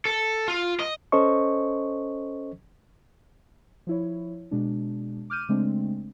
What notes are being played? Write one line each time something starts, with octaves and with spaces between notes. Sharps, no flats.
A4
F4
D#5
C#4 A4 C5 D#5 C#6
F3 E4 C#5
B2 G#3 D4
D6 F6 G6 D#7
C#3 G#3 A3 C4 D4